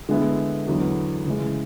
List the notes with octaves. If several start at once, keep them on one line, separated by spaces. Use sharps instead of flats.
D3 G#3 B3 E4
E2 D3 F#3 B3
C#3 E3 G#3